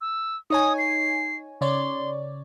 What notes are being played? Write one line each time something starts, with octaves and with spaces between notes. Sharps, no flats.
E6
D#4 C#5 G#5 D#6
C7
C#3 C#5 D5 C6